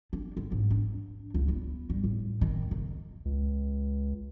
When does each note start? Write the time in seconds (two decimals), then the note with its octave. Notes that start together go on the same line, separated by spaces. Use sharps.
0.13 D4
0.37 D3
0.52 G#2
0.70 D4
1.34 C#2
1.48 B3
1.90 G2
2.04 A2
2.41 D#3
2.71 C#3
3.25 C#2